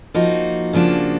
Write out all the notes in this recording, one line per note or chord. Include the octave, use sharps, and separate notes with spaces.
F3 A#3 D#4 F#4
C#3 F3 A#3 D4 F#4